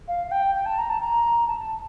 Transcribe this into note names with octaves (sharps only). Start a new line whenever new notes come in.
F5
F5
G5
G5
A5
A#5
A5
A#5
A5
A5